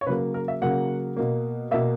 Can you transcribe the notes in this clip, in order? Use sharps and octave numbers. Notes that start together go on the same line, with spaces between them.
C#5
C#3 F#3 A#3 B4
A#4
E5
C#3 F#3 A#3 F#5
B2 A#3
B2 A#3 E5